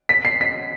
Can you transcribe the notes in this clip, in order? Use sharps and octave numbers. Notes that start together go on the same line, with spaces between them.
B6
C7
B6